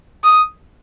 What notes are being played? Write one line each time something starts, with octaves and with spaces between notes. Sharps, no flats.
D#6